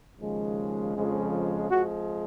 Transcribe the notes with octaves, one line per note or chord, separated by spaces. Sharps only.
D#2 C#3 F3 G#3
F2 C#3 F3 G#3
F2 F3 G#3 F#4